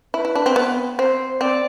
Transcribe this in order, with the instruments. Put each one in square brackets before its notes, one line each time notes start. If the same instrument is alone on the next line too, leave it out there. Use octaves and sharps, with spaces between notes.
[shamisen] E4 [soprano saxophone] B4
[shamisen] E4
D4
C4
B3
[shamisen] C4 [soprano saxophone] C5
[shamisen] C4 [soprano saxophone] D5